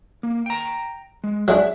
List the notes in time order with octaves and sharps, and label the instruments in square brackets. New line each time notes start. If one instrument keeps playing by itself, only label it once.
[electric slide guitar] A#3
G5 A#5
G#3
[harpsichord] F#3 G#3 D4 [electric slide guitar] E5